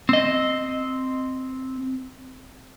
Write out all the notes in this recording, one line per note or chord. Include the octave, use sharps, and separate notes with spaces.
C4 D#5